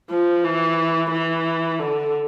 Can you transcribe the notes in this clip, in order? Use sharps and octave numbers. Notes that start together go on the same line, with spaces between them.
F3
E3
E3
D3